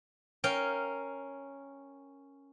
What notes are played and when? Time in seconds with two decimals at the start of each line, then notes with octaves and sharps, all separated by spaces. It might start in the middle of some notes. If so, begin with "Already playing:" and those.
0.44 C#4 A#4 F5 G5